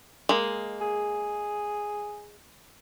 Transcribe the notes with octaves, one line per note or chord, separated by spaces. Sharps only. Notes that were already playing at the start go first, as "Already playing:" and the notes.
G#3 A#3
G#4